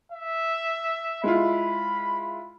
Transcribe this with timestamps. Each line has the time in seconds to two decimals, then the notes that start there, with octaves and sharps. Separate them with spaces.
0.12 E5
1.24 G#3 E4 F4 B5